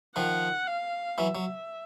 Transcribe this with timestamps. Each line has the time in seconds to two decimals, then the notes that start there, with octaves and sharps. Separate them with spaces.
0.16 D#3 F3 F#5
0.67 F5
1.18 E3 F#3 E5
1.35 F#3